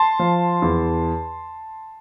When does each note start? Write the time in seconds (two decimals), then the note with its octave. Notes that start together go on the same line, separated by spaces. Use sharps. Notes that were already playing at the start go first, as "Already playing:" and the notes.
Already playing: A5 C6
0.19 F3
0.62 E2